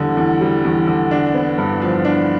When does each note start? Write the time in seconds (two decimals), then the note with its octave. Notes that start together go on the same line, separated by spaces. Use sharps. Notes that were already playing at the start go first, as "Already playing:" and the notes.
Already playing: E2 D3 G3
0.17 E2
0.41 G3
0.65 E2
0.87 D3
1.11 D4
1.34 B3
1.58 G2
1.82 F3
2.05 D4